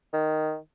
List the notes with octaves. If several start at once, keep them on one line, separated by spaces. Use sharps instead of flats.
D#3